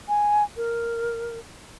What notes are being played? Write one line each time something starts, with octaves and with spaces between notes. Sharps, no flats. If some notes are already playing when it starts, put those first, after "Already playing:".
G#5
A#4